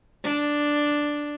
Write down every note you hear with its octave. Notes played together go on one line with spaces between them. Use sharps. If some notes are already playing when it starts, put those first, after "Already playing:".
D4